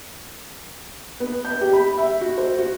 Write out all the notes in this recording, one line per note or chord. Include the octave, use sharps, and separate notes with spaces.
B3
G6
G4
B5
E5
F#4
C5
F#4